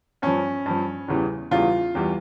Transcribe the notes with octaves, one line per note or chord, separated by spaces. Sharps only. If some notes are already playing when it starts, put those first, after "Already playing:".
G2 F3 C#4
G2 F3
E2 C#3 E3 G3
E2 C#3 E3 G3 F4
E2 E3 G3